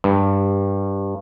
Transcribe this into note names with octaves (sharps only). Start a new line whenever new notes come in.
G2